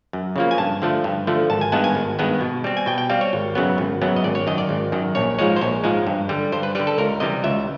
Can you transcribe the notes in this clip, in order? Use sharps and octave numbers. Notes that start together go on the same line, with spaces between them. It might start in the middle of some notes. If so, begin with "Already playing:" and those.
F#2
C#3 F3 A#3
G#5
G2 A5
D3 F3 A3
G2
D3 F3 A3
G#1 A5
G#5
G2 D#3 G#3 B3 A5
G#5
G#1
G2 D#3 G#3 B3
B2
G3 C4
G#5
B2 G5
G5
G3 C4 F5
C#5
G#1
F#2 C#3 F#3 B3
G#1
F#2 C#3 F#3 B3
D#5
G#1 D5
C#5
F#2 D#3 D#5
D5
G#1
F#2 D#3
A#1 C#5
G#2 F3 G#3 C#5
C5
A#1 C#5
G#2 F3 G#3
G2
D3 G3
G2 C5
B4
D3 G3 B4
A4
C#2 A#4
C3 E3 G3 D#5
C#2 E5